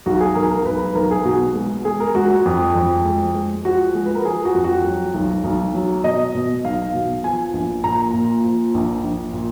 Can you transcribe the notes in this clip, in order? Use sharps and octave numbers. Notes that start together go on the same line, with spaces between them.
B1 F#4
G#4
B1 A#4
A#4
B1 B4
B4
B1 A#4
G#4
B2 F#4
G#3
G#3 G#4
A#4
G#3 F#4
F#4
F2
F2
G#3
G#3
F3 F#4
G#3
B4
A#4
F3 G#4
F#4
F2
F#4
F#3
B1
B1
F#3
B2 D#5
B2
B1 F5
B2
F3 G#5
A#1
A#2 A#5
A#2
F3
A#1
A#1
A#2